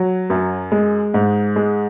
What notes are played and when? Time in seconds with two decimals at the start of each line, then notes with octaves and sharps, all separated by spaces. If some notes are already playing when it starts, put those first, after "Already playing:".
Already playing: F#3
0.30 F#2
0.72 G#3
1.14 G#2
1.56 G#3